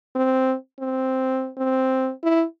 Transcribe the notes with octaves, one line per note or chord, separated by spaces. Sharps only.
C4
C4
C4
E4